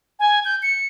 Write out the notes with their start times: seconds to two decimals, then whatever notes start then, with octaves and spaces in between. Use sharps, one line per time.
0.20 G#5
0.45 G6
0.63 C#7